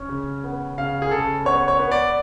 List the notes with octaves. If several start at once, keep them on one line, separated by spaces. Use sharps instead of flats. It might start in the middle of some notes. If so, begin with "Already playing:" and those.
Already playing: C#4
C#3
B3
C#3 F5
G#4
C#3 A4
B3 C#5
C#5
B3
D5